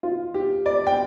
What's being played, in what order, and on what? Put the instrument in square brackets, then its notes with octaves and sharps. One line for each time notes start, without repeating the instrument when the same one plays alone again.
[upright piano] F4
G4
D5
G5